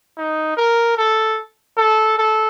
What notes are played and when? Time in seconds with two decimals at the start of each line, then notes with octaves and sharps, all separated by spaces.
0.17 D#4
0.57 A#4
0.97 A4
1.77 A4
2.18 A4